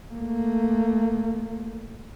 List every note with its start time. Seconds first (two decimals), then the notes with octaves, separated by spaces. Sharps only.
0.14 A3 A#3